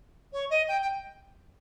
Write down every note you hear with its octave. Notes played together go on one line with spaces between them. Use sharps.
C#5
D#5
G5
G5